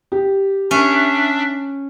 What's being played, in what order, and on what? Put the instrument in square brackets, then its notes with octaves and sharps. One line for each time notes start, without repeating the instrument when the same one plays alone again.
[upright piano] G4
[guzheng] C#4 [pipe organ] D4 E5